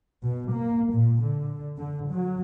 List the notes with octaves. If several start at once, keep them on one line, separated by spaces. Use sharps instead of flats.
B2
A#3
A#2
D3
D3
F#3